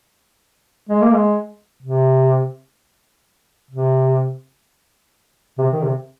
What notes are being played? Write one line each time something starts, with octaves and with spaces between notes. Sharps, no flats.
G#3
A#3
G#3
C3
C3
C3
D#3
C3